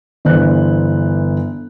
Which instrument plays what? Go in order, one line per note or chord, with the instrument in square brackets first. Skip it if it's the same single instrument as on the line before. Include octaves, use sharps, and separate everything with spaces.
[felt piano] G1 E3 C5 D5 F#6